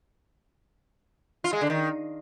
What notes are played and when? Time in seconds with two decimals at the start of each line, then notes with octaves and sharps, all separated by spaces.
1.44 F4
1.53 G#3
1.61 D3
1.70 D#3